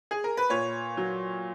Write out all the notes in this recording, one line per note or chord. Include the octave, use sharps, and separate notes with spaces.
G#4
A#4
B4
A#2 C#5
F#3